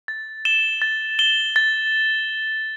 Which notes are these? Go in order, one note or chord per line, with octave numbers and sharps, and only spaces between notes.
A6
E7 G7
A6
E7 G7
A6